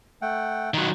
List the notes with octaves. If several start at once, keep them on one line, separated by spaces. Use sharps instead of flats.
A3 F#5 G5
D#3 F#3